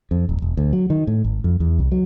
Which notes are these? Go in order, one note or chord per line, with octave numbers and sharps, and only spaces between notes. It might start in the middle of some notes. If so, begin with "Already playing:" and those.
F2
D1
E1
D2
F#3
D#3
A2
G#1
F2
E2
C2
F#3